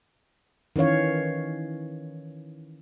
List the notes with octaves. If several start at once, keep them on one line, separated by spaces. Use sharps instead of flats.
D#3 E3 C#4 C#5 F5